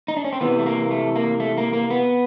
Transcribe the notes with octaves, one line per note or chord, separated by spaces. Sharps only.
D#4
D4
C#4
C4
C3 E3 B3
A3
A#3
A3
A#3
A3
A#3
A#3
B3